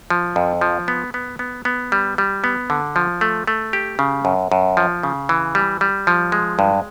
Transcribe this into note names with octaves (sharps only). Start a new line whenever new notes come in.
F3
F2
F3
B3
B3
B3
B3
G3
G3
B3
D3
F3
A3
A3
G4
C#3
F#2
F#2
F3
C#3
E3
G3
G3
F3
G#3
G2